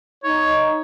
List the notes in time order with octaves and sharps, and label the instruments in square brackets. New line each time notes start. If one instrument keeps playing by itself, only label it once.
[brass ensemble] D#4 [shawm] C#5